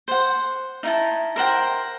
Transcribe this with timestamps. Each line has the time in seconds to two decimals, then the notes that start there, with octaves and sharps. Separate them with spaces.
0.08 C5 F#5
0.83 D#4 E4 A5
1.36 A#4 C5 F#5 G5